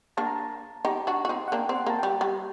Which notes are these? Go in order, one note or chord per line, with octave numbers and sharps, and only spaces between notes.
A#3 D4 A5
A#5
A5
D#4 G4
D4 F#4
F#4
C4 D#4
F#5
A#3 D4 G5
C4
F#5
A#3 A5
G3 G5
G3